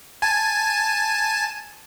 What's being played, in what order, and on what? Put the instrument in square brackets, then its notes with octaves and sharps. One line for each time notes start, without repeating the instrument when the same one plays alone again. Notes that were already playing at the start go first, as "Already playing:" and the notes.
[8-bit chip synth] G#5 A5